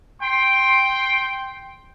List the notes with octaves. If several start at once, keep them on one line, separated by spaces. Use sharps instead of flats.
G5 C6